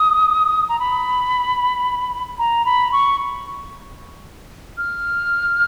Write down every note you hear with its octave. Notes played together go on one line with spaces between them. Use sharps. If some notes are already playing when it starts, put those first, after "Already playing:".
Already playing: D#6
A#5
B5
A#5
B5
C#6
F6